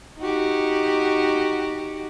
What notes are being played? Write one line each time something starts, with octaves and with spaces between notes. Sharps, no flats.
D#4 F#4 G4